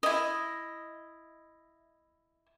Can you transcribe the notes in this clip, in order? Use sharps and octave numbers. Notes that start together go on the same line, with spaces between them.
E4 D#5